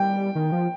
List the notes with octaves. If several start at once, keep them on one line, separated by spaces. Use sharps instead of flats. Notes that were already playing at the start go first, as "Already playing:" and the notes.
Already playing: G3 G5
D#3
F3